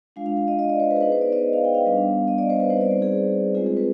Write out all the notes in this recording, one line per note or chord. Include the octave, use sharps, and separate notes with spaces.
G#3 D4 F4 F5
F5
F5
D#5
D#5
D5
C5
B4
G#4
B3 D#4 B4
C5
D5
D#5
F5
G5
F5
G3 B3 D4
D#5
D5
C5
B4
G3 C4 D#4 C5
D5
C5
G#4
G#3 C4 F4 G#4
G#4
B4